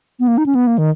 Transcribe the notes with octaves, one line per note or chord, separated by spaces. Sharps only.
B3
A#3
D#4
C#4
B3
A#3
D#3